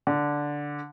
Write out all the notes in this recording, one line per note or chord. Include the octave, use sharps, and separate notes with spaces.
D3